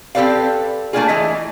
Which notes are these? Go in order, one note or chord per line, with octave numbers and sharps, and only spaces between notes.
C4 G4 A4 B4 D5 F5
A3 A#3 C#4 D4 F4 G#4
E3 A3 D#5